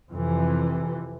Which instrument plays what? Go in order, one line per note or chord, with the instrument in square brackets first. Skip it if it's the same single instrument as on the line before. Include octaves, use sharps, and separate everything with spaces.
[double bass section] F2 C3 E3